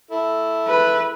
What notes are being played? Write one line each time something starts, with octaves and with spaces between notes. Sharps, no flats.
E4 A4
B4